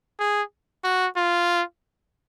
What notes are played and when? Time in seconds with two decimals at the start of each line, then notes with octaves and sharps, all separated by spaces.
0.19 G#4
0.84 F#4
1.16 F4